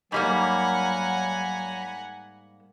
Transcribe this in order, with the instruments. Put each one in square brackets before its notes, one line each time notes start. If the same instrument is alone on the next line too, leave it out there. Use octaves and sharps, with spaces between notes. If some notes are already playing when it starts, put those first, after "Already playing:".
[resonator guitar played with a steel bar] G#2 G3 A#3 [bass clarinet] F#3 [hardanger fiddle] F#5 G#5 [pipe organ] A#5 B5